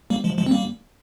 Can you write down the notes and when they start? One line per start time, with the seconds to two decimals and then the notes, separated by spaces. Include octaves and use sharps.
0.10 G3 A#3
0.24 F3 G#3
0.38 F3 G#3
0.46 C4
0.51 G3 A#3